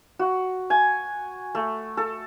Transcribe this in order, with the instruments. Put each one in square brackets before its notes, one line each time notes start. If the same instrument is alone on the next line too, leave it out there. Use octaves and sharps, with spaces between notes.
[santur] F#4
G#5
A3
A4